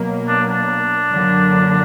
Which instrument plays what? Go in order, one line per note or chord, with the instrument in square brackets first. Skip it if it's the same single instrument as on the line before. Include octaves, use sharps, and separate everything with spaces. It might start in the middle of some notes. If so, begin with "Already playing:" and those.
Already playing: [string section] B2 F#3 A#3
[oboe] D4
D4
[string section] F#2 D3 F#3 A#3